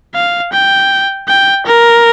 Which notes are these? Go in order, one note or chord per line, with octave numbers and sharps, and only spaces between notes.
F5
G5
G5
A#4